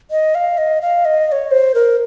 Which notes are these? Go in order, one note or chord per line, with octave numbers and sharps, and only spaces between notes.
D#5
F5
D#5
F5
D#5
D#5
C#5
C5
A#4